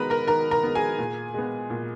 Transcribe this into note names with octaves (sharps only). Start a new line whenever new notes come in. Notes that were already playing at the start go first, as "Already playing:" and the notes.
Already playing: D#3 G#3 B3 A#4 B4 A#5 B5
A#4 A#5
D#3 A#4 A#5
A#4 A#5
G#3 B3
G#4 G#5
A#2
G#3 B3
A#2